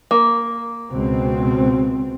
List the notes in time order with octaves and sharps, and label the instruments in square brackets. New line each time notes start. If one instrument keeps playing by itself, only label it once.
[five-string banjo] A#3
[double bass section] C#2 B2 C4